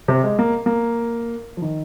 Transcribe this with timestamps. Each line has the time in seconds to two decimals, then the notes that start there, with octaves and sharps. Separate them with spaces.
0.08 C3
0.23 G#3
0.39 A#3
0.66 A#3
1.57 F3
1.62 D#3